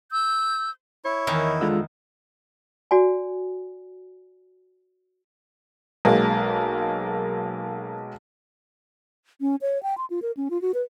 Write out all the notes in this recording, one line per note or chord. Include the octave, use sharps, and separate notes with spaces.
E6 G6
E4 C#5
E2 D#3 A#5
D3 G#3 F4 E6
F#4 D5 G#5
B1 G#3 A#3
C#4
C#5
G5
C6
F4
A#4
C#4
F4
F#4
B4